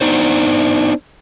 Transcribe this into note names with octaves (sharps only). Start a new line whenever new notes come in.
B3 D4 D#4 C5